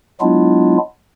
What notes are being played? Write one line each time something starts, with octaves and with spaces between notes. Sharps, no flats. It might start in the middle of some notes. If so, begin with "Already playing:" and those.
F#3 G#3 B3 D4 E4 F4